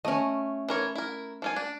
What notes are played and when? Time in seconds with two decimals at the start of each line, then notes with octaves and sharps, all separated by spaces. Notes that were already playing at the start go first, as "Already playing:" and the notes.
0.05 A3 C#4 D#5
0.69 E3 A#4 C#5
0.96 E4 A#4
1.42 F3 F4 G#5
1.56 D4